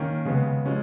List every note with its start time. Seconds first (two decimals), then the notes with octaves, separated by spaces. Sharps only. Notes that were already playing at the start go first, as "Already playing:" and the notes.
Already playing: D#3 A#3 C#4
0.25 C#3 G#3 B3
0.66 F3 G#3 C#4